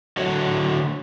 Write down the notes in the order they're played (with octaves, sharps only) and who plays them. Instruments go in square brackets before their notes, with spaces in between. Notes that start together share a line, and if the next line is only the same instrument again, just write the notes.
[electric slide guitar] D3 F#4 C#5